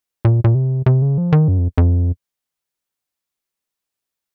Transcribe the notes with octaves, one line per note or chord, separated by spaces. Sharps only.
A#2
A#2
C3
C3
C#3
F3
D#3
F#2
F2
F2